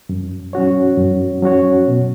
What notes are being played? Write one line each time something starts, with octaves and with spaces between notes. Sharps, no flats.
F#2
F#3 C#4 F#4 C#5
F#2
F#3 C#4 F#4 C#5
B2